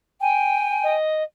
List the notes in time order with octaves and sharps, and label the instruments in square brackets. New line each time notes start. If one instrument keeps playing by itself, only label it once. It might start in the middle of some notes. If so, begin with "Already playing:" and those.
[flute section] G5 [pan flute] G#5
[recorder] D#5